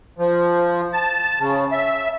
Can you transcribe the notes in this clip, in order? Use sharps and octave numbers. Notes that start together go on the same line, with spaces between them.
F3
A5
C#3
E5